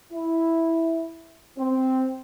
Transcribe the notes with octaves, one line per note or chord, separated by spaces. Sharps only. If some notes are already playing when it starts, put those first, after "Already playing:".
E4
C4